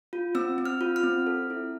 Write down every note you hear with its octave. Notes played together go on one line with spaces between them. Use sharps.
F4
C4 E6
C4
F6
F4
F6
C4
A4
E4